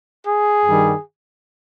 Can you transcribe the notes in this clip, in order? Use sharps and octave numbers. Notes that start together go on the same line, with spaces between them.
G#4
G2 D#3 G3